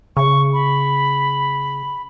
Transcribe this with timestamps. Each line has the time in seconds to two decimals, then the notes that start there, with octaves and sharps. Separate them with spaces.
0.17 C#3 C#6
0.53 B5